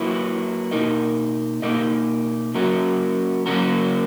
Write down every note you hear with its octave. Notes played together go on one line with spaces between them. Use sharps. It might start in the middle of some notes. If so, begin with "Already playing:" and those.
Already playing: F#3 A#3 E4 B4
B2 A#3 D#4 A#4 D#5
B2 A#3 D#4 A#4 D#5
F#3 A#3 C#4 F#4 A#4
F#3 A#3 C#4 F#4 A#4